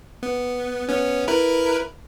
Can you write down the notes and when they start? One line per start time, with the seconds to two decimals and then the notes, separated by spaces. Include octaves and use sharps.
0.23 B3
0.89 B3 C#4
1.28 E4 A#4 B4